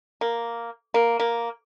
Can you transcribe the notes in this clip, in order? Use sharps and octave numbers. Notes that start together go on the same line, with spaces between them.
A#3
A#3
A#3